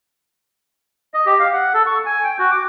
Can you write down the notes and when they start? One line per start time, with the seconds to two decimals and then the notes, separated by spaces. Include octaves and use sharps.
1.14 D#5
1.26 G4
1.39 F5
1.53 F#5
1.74 A4
1.86 C#6
2.06 G#5
2.24 G5
2.39 F#4
2.51 D6